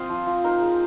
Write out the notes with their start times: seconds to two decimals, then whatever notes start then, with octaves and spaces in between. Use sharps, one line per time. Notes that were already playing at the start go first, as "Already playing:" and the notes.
Already playing: C4 F4 C5 D#5 F5
0.09 F3
0.27 F3
0.44 D#4 A#4
0.61 G#3